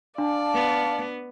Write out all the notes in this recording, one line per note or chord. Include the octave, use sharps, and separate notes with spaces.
D4 D5 F5 A5
B3